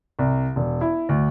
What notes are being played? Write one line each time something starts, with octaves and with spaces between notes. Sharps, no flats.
C2
E1
E4
D2